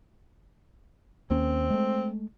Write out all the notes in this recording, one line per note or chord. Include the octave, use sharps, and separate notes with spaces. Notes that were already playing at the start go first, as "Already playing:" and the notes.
D#2 A#3 C4 C#4
G#3 A3